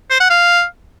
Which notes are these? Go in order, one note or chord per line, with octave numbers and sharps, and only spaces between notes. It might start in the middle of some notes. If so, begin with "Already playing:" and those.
C5
F#5
F5